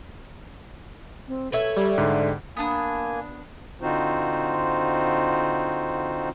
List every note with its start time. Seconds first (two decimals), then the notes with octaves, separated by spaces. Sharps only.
1.28 C4
1.52 A4 B4 C#5 E5
1.77 G3
1.98 G#2 D3
2.57 A#3 B3 D4 G#5 D#6
3.81 D3 C4 D#4 F4 F#4 C5